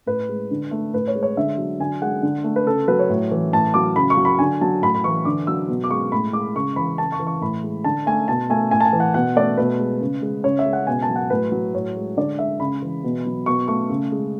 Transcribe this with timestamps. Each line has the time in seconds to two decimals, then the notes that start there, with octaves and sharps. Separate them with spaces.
0.06 A2 B4
0.29 G#3
0.51 D3
0.71 A3
0.93 A2 B4
1.08 C#5
1.15 G#3
1.23 C#5
1.37 D3 E5
1.58 F#3
1.80 D3 G#5
2.02 G#3 F#5
2.23 D3
2.44 A3
2.56 B4
2.66 C#3 A4
2.88 F#3 B4
2.99 C#5
3.09 A2
3.31 E3
3.53 A2 A5
3.74 F#3 D6
3.96 C#3 B5
4.10 C#6
4.17 F#3
4.25 B5
4.39 D3 G#5
4.61 F#3 A5
4.82 A2 B5
4.95 B5
5.04 E3 C#6
5.25 D3 D6
5.47 F#3 E6
5.68 B2
5.84 D6
5.90 G#3 C#6
6.12 A2 B5
6.33 G#3 D6
6.55 C#3 C#6
6.76 E3 B5
6.98 C#3 A5
7.12 C#6
7.20 E3
7.27 C#6
7.41 A2 B5
7.64 G#3
7.84 D3 A5
8.06 A3 G#5
8.28 B2 A5
8.50 A3 G#5
8.71 A2 G#5
8.80 A5
8.85 G#5
8.93 E3
9.00 F#5
9.14 B2 F#5
9.36 A3 D5
9.57 B2 B4
9.80 G#3
10.01 C#3
10.22 G#3
10.44 C#3 C#5
10.59 E5
10.65 G#3
10.73 F#5
10.87 B2 G#5
11.02 A5
11.10 F#3
11.16 F#5
11.30 A2 B4
11.52 F#3
11.74 A2 C#5
11.96 G#3
12.17 D3 D5
12.38 G#3 E5
12.60 C#3 B5
12.82 E3
13.04 B2
13.26 F#3
13.46 B2 C#6
13.68 A3 C#6
13.89 C#3
14.12 G#3